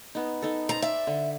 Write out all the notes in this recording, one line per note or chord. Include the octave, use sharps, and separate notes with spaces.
B3 D#4
D#4 A4
C5 A5 A#5
D5 E5
D3